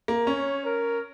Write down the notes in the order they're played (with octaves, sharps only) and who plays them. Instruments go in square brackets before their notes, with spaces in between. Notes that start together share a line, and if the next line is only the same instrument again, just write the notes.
[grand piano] A#3
[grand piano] C#4 [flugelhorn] C#5
[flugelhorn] A#4